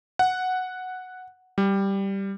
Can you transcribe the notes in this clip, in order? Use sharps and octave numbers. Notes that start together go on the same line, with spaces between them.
F#5
G3